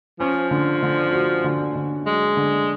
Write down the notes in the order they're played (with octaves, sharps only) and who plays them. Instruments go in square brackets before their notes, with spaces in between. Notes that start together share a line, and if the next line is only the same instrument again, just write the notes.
[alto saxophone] F3 [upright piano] C#4
[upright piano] D3
D3
F#4
D3
D3
[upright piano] F#3 [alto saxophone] G#3
[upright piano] D3